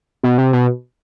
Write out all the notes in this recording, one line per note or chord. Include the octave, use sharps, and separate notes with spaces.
B2
C3
B2